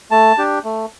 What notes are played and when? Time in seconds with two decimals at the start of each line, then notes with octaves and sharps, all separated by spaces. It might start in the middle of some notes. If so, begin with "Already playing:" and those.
0.11 A3 A5
0.38 D4 G4
0.64 A3